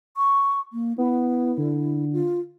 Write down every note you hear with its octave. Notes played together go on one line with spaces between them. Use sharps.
C#6
A#3
B3 E4
D3
F4